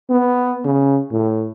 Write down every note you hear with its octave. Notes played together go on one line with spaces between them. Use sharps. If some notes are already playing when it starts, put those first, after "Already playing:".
B3
C#3
A2